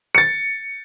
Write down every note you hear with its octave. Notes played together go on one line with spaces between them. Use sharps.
A6 C#7